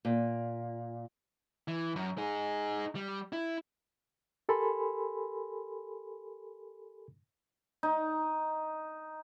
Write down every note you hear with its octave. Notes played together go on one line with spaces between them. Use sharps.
A#2
E3
F#2
D#4 G#4
G3
E4
G4 A4 A#4 G#5 B5 C6
D#4